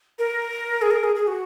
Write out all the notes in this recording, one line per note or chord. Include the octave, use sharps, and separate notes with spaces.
A#4
G#4
A#4
G#4
G#4
F#4